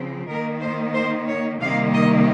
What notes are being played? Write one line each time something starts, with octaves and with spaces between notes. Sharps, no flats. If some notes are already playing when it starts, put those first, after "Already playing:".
Already playing: C#3 F3 C4
D#3 A#3 A#4
C5
C5
C#5
C3 D#3 G3 A#3 F5
D#5